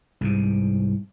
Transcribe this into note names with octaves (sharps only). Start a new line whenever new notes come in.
C2 G#2 C3